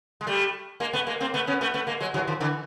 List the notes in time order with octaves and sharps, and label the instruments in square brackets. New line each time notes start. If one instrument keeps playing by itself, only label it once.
[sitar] G#3
G3 A3
G#3 A#3
A3 B3
G#3 A#3
A#3 C4
A3 B3
B3 C#4
A3 B3
A3 B3
G#3 A#3
F#3 G#3
E3 F#3
D#3 F3
D3 E3